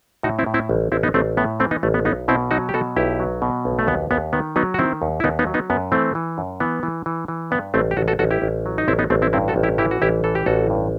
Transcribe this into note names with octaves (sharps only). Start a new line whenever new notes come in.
A2 D#4 F#4
C4 E4
A2
C4 E4
A1
A1 C4 E4
B3 D#4
A1 A3 C4
A2 B3
E3 A3 C4
B3 D#4
A1 A3
B3
B1 B3 D#4
B2 C4 E4
F#3 D#4 F#4
G4
B2 F#4 A4
B1 E4 G4
F#3
B2
B1
A3
D#2 B3
D#2 B3
D#3 B3
F#3 B3 D#4
F#4
D#3 C4 E4
D#2
E4
D#2 B3 D#4
B3 D#4
F#3
B3 D#4
F#2 B3
E3 A3 C4
E3
F#2
E3 B3
E3
E3
E3
G2 B3
A1 A3 C4
G4
A1 F#4 A4
F#4 A4
A1 F#4 A4
E4 G4
A1
F#3
D#4
A1 C4 E4
B3 D#4
A1 A3 C4
C4 E4
G2 C4 E4
F#4 A4
A1
E4 G4
E3 E4 G4
F#4
A1 E4 G4
E3 A4
G4
A1 F#4 A4
G2